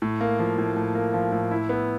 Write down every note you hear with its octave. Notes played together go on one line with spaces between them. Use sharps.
A2
A#3
F3
A2
A2
A#3
F3
A2
E4
B3